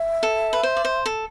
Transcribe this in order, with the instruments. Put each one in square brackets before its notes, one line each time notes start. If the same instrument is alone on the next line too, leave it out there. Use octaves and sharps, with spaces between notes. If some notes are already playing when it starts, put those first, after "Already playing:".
Already playing: [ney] E5
[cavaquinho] A4
B4
C5
D5
C5
A4